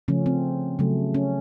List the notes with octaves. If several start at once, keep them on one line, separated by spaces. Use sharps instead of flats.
C#3 F3 A3 C#4
C4
C#3 F#3 A3
C#4